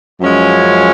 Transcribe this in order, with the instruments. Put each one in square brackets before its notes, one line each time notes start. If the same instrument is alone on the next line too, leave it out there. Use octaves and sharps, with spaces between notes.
[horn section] F#2 F3 G#3 C#4